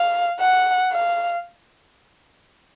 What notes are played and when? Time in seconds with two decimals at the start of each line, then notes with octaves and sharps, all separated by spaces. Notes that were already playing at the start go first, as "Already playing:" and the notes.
Already playing: F5
0.41 F#5
0.92 F5